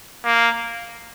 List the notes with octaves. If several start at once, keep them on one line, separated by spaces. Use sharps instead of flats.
A#3